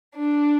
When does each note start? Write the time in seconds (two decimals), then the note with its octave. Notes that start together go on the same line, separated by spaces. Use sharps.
0.15 D4